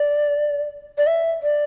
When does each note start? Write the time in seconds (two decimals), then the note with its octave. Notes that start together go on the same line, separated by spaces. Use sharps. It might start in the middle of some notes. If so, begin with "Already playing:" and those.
Already playing: D5
0.98 D5
1.07 E5
1.43 D5